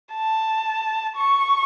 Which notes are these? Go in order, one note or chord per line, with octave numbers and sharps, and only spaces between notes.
A5
C#6